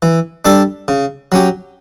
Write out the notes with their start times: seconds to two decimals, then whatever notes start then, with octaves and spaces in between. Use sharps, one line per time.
0.02 E3
0.45 G3 D4 A4 D5
0.88 C#3
1.32 F#3 C#4 G4